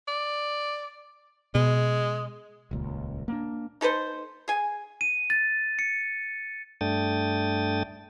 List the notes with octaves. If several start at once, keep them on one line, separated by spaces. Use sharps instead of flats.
D5
B2 G#3
D#1 C#2 A#2
A#3 B3 D4
D#4 A4 B4 C5
G#4 G#5
D#7
A6
C#7
G2 A3 D4 G5 D#6 A6